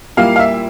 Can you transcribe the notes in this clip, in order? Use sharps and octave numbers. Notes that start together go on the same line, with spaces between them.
A#2 G3 A#3 E4 F5
F5
E5